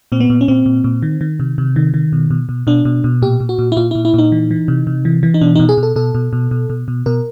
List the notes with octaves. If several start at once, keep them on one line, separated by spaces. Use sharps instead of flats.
A#2 C4
B3
A#2
C#4
A#2 C4
A#2
A#2
D#3
D#3
C3
C3
D#3
D#3
B2
B2
B2
B2 D4
B2
B2
A#2 G4
A#2
F#4
A#2
E4
A#2 F4
A#2 E4
E4
A#2 D#4
E3
E3
C3
C3
E3
E3
D#4
B2 D4
B2 D#4
G#4
B2
A4
B2 A4
B2
B2
B2
B2
B2
B2 A#4